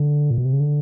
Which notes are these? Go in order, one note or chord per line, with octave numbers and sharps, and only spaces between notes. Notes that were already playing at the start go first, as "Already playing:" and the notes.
Already playing: D3
A#2
B2
C3
C#3
D3